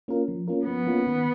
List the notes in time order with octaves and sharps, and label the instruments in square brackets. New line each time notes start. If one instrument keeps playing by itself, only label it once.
[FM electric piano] A#3 C#4 F4 A#4
F3
A#3 C#4 F4 A#4
[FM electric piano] F3 [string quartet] B3
[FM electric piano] A#3 C#4 F4 A#4
D#3